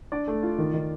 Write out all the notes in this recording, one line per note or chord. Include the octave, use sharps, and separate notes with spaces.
D4 D5
A3
F4
D#3
D#3